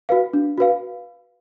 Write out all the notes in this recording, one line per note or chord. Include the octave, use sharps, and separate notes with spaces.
F#4 B4 F5
D4
F#4 B4 F5